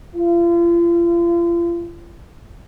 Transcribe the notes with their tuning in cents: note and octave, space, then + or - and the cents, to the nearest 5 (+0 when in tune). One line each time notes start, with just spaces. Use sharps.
F4 -40